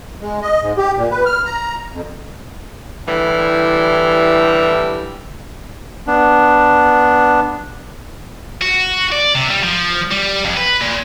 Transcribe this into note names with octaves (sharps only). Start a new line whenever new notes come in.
G#3
D#5
G#2
G4
A#2
B4
F6
A#5
F2
A2 D3 E3 G3
B3 D4
F#4
D5
C3
G3
F3
G3
F2
B4
A#2